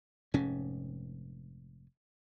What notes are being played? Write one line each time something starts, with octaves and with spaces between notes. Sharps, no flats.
F1 G#2 C#4